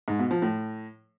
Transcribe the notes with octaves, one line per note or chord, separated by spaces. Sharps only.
G#2
B2
F3
A2